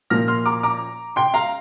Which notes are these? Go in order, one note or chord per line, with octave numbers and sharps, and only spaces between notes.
A#2 F3 A#3 F6 A#6
C6 F6
A#5 D6
A#5 D6
G5 C6
F5 A#5